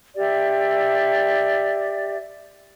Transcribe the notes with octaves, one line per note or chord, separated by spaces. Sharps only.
G4 D5 E5